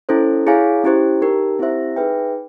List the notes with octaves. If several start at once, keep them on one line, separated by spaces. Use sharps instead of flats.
C#4 E4 A4 C5
E4 G#4 C#5 F5 G#5
C#4 E4 G4 C5
D#4 G4 A#4
C4 E4 G4 C5 E5
D#4 G#4 B4 E5 G5